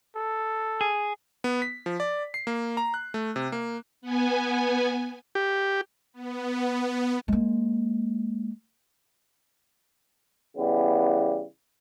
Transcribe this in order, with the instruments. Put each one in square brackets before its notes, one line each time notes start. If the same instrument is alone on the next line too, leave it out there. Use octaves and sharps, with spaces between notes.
[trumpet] A4
[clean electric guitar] G#4
[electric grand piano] B3
B6
F3
D5
C7
A#3
A#5
F#6
A3
C3
A#3
[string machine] B3 G#5
[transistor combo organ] G4
[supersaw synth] B3
[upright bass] G#3 A#3
[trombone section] C#3 E3 G3 B3